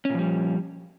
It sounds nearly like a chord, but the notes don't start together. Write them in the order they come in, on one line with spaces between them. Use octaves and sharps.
C#4 A#2 F3 G3